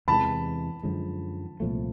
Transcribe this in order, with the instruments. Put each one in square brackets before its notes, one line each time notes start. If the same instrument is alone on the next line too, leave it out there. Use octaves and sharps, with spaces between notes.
[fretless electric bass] E2 C3 E3 G#3 [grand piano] A5 B5
[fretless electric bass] F#2 D3 F3 G#3
C2 A#2 F3 A3